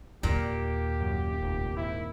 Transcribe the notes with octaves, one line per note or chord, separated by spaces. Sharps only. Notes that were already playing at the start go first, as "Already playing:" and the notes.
D#2 A#2 G4
F#2
F1
G#1 E4